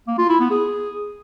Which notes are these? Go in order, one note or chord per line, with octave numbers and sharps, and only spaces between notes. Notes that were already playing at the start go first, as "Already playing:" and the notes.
A#3
F4
E4
B3
G#4